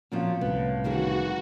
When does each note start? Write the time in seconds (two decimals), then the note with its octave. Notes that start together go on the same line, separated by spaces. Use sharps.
0.12 A#2 F3 F#3 C4 C#4 F5
0.41 C2 A2 B3
0.84 D#3 E3 F#4 G#4